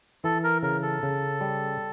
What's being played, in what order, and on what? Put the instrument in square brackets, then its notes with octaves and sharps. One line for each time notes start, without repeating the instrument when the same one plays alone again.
[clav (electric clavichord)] E3 [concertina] A4
[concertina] A#4
[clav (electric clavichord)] C#3 [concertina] A#4
[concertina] A4
[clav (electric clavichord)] C#3
G3